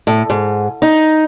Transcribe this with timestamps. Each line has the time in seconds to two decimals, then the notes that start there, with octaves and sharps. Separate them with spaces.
0.07 A2
0.30 G#2
0.82 D#4